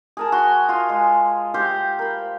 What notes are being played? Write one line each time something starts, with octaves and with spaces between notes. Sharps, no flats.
G#4 A#4 A5
F#4 C6
F4 G#5
G#3
G4 C5 F5
A#4 B5